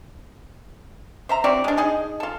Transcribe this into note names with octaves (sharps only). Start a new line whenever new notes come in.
C5 E5 A#5
C4 E4 F#4 D5
G#3 D4
D#4 G#4 D#5
F4 A4